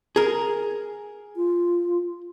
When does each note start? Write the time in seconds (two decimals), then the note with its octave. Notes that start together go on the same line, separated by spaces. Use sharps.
0.16 G#4 A#4
1.36 F4